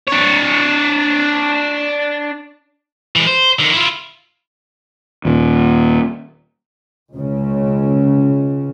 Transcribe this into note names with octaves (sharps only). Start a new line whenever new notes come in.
D4 C#5
E3 G#3
C5
D3 D#3
E4 F4
D#2 A#2
C#2 C#3